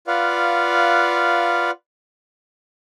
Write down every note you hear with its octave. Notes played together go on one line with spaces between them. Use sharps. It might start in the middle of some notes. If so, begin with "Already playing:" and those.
F4 B4 D5 F5 F#5